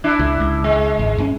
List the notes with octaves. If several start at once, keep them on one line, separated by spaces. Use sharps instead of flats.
D4 E4
C#2
C#2
G#3
G#1
G2 C4 C#4